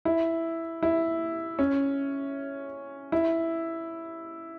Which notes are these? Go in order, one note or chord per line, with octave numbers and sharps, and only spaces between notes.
E4
E4
C#4
E4